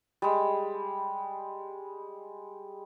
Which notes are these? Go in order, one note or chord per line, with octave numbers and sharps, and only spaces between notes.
G3 G#3